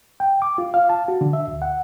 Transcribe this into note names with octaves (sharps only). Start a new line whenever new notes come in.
G5
D6
F4
F5
A5
F#4
D3
E5
D2
F#5